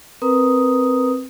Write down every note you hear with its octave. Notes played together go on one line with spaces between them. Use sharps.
C4 A#4 B4 A#5 D#6